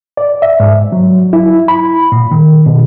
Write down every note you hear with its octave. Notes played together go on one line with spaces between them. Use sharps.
D5
E5
G#2
F#3
E4
B5
A#2
D#3
B2